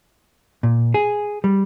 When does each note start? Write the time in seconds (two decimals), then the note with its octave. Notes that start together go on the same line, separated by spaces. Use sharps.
0.63 A#2
0.94 G#4
1.44 G3